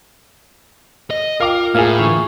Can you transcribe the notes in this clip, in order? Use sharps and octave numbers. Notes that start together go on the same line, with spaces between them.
D#5
F4 A#4 F5 G5 D6
A2 A#3 E4 G#4 F5
D3 E3 C#6